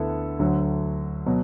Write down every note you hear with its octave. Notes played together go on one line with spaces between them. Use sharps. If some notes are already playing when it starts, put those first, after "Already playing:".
Already playing: D2 D3 B3 E4 A4
D2 D3 F#3
B2 F#3